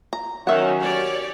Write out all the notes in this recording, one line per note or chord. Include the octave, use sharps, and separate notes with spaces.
A#5
D#3 F#3 C#4 E5 F#5
G4 C#5 D5